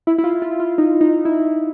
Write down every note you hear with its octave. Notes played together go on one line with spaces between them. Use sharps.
E4
E4
F4
F4
F4
D#4
D#4
E4